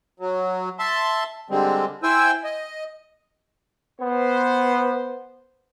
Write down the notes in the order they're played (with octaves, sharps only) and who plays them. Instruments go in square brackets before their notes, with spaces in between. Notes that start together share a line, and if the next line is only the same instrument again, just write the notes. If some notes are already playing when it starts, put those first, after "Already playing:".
[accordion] F#3
E5 A5 C6
D3 G3 G#3 C4
E4 C5 G5 G#5 E6
D#5
[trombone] B3 [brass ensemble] B4 C5